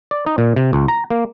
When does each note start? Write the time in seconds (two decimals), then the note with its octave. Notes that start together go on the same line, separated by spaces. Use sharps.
0.11 D5
0.26 D#4
0.38 A#2
0.56 C3
0.73 C#2
0.88 A#5
1.10 A#3